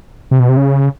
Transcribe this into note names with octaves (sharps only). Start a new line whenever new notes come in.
C3
B2
C3
C#3